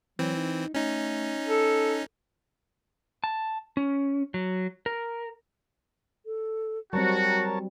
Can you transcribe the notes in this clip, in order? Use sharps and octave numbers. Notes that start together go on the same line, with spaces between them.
E3 F#3 C4
D#4
A3 C#4 D#4
A4
A5
C#4
F#3
A#4
A4
F#3 G3 C4 F#4 A#4 C#5 A5 A#5